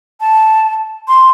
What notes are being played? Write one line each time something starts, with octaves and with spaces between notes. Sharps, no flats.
A5
C6